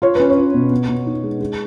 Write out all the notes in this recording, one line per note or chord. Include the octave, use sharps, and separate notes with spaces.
F4 C#5
C#4 B4
C#5
F4
B2
B3
B2
D#4
G#3
G#3